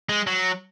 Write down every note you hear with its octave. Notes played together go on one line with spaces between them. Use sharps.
G#3
F#3